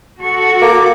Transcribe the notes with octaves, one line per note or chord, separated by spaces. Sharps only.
F#4 A4 C#6
A#3 D6